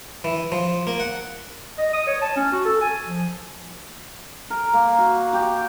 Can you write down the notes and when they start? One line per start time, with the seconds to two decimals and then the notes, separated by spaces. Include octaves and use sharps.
0.24 E3
0.52 F3
0.87 A#3
1.00 F#5
1.78 D#5
1.93 D#6
2.07 C#5
2.22 A5
2.36 C#4
2.52 F#4
2.65 A4
2.81 G#5
3.06 F3
4.50 A#4
4.73 A#3
4.98 F#4
5.33 G4